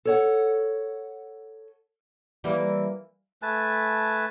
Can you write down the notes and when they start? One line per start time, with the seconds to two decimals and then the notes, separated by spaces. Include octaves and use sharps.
0.05 A4 C#5 F#5
2.44 E3 G3 A#3
3.42 A3 B4 G#5 A5